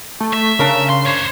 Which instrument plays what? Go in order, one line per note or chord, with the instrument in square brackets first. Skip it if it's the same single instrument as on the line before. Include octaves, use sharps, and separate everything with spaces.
[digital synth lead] A3
[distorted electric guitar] E5
[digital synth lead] C#3 [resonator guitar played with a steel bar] D4 A#4 A#5
[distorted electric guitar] C6
C5 C#5